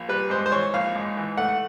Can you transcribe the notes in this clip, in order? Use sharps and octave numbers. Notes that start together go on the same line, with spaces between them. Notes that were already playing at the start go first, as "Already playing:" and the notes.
Already playing: A#1
G3 B4
G#2 C5
C5
E3 C#5
A#1 F5
G#2
E3
A3 F#5